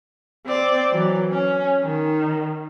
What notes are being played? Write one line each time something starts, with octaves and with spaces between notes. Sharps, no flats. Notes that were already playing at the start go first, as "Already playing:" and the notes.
C4 D5
E3 F#3
C#4
D#3